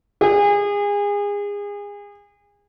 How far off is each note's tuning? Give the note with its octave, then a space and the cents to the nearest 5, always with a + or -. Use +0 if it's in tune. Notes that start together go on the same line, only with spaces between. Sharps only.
G#4 -30